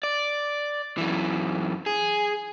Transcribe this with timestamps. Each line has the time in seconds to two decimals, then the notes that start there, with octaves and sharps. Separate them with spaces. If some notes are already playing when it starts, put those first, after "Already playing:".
0.03 D5
0.98 F#2 E3
1.86 G#4